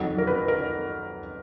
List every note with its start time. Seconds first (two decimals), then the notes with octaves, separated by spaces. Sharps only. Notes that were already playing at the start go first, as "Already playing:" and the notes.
Already playing: F2 D#3 F#3
0.18 A#4
0.27 B4
0.48 A#4